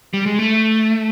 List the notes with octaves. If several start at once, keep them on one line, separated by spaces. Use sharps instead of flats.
G3
G#3
A3